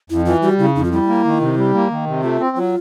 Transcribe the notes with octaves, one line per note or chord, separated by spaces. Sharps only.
F2 E4
E3 F4
G3 F#4
C#3 E4
F2 D#4
F4
G3 E4
A#3
D#3
C3
G3
A#3
D#3
C3
A3 F4
C4
F#3 F4